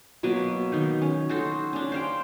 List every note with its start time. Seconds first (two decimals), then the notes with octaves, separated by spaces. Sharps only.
0.23 B2 F#3 A#3 B4
0.72 D#3 D#4
1.02 C#4
1.29 D#4 F#4 A4 C5
1.73 C#4 D4
1.92 C5 F5 G5